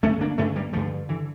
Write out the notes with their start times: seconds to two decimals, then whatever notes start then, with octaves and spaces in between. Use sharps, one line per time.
0.03 G2 D3 A3 C#4
0.21 A#3 D4
0.38 G2 D3 A3 C#4
0.56 G3 A#3
0.73 G2 D3 F3 A3
1.09 D3 E3